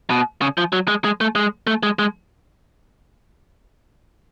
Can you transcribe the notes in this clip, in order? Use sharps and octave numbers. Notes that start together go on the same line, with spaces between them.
B2
C#3
F3
F#3
G#3
G#3
A3
G#3
A3
G#3
G#3